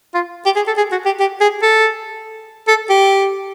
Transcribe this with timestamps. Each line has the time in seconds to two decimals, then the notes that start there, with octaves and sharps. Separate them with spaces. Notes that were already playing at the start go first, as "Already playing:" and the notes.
0.14 F4
0.46 G4
0.56 G#4
0.67 A4
0.77 G#4
0.92 F#4
1.06 G4
1.20 G4
1.41 G#4
1.62 A4
2.68 A4
2.89 G4